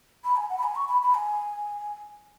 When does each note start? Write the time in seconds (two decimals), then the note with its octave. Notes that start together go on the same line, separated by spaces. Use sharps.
0.24 B5
0.36 G#5
0.50 F#5
0.58 B5
0.63 G#5
0.75 C#6
0.88 B5
1.02 B5
1.14 G#5